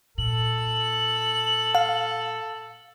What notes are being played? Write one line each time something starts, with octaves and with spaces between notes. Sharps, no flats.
A#2 A4 F#7
F5